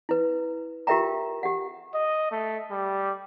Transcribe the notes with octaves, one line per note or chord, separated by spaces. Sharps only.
E4 B4
F4 G4 A#4 E5 G5 A#5
G4 F#5
D#5
A3
G3